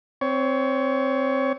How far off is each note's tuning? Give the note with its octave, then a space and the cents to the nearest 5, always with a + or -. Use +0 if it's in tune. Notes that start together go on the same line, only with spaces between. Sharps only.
C4 +0 C#5 +20